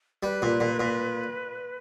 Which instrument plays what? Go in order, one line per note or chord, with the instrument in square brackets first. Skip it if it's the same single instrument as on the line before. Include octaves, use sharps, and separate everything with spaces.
[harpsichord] G3 [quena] B4
[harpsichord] A#2
A#2
A#2